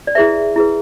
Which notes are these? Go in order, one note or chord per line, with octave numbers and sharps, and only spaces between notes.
D5
E4 G#4 B4 E5
E4 G#4 B4